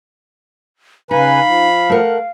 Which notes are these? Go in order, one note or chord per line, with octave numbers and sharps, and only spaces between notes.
C#3 D#4 B4 F5 G#5 B5
F3
A3 A#4 F#5